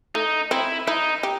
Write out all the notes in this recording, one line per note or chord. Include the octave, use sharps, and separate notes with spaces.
A3 D#4
C4 E4
D#4 E4
G4